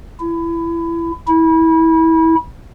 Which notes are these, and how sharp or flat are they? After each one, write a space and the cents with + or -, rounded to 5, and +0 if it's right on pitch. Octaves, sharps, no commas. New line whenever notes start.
E4 +25
E4 -25